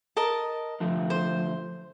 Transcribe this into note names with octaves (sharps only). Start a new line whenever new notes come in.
A#4 D#5 A5
D3 F3 A3
C5